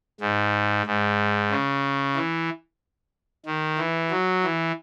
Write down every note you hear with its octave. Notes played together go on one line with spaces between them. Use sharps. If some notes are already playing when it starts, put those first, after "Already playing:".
G#2
G#2
C#3
E3
D#3
E3
F#3
E3